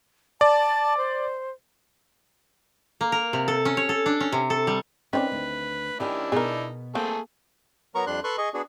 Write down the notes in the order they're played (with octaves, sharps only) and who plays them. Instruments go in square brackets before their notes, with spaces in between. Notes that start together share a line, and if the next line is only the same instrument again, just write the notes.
[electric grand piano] D5 [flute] A5
[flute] C5
[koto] A#3
A#4
C3
A4
C#4
C#5
A4
D4
C#4
C3
A4
G3
[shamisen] D#3 C4 D5 [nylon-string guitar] C#4 [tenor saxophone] B4
[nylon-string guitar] D2
[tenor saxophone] D#3 [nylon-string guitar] C#4 G4 G#5 [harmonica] D4 E4
[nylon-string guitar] B2 B3 [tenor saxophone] D#4 [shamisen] G#4 A#4
[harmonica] A3 G#4 A4 [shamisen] A#3 [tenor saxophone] C4
[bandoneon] F#3 B3 A#4 A#5 C#6
F2 G3 D4 C6 F#6
A4 B4 C6 C#6 F#6
G#4 D#5 C#6
B3 D4 F#4 G#4